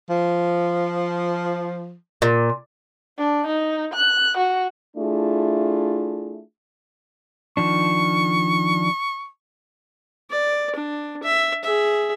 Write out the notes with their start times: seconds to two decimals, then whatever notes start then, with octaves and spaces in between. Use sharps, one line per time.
0.09 F3
2.22 A#2
3.18 D4
3.46 D#4
3.93 F#6
4.37 F#4
4.97 A3 D4 E4 F4 G#4
7.57 D#3 F3 D4 C#6
10.30 D5
10.75 D4
11.23 E5
11.64 G#4 E5